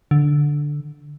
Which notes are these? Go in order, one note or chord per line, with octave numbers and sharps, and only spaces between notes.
D3